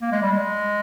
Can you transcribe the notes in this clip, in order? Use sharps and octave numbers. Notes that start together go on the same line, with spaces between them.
A#3
G#3
G3
G#3